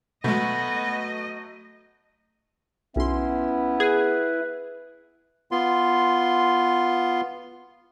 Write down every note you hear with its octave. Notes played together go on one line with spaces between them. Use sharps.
B2 F#3 G#3 A3 B3 D#5
B1 B3 C#4 E4 C6
G#4 B4
B3 F4 C6